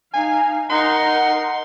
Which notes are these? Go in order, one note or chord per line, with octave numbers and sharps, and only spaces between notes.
D#4 F5 G#5
D#4 A#4 F#5 C6